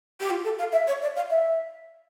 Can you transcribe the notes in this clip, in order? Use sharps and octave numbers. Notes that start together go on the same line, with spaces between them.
G4
F4
A4
F5
E5
C#5
D5
F5
E5